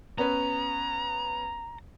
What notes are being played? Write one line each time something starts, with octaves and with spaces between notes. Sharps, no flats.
B3 C#4 B4 A#5